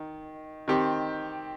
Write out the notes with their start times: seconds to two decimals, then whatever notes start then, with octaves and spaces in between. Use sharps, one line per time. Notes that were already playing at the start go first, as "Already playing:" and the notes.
Already playing: D#3
0.68 D#3 C4 G4